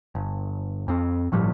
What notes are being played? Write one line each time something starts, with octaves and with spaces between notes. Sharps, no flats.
G1
F2 C4
G1 A2 F3 G3